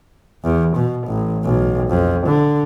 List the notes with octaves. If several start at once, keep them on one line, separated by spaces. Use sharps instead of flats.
E2
B2
A1
B1
F2
D3